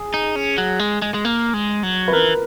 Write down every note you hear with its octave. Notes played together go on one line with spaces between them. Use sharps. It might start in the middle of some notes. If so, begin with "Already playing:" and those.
Already playing: G#4
D#4
C#4
F#3
G#3
G#3
G#3
A#3
G#3
F#3
B4
E3 A#4